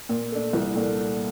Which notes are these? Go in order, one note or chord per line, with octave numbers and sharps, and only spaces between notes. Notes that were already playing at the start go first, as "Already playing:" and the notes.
A#2
A3 D4
C2
A#2 A3 D4